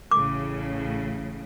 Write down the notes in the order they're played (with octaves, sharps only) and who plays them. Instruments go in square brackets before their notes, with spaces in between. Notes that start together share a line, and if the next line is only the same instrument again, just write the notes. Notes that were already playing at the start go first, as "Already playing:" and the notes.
[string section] A1 A2 C#3 [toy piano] D6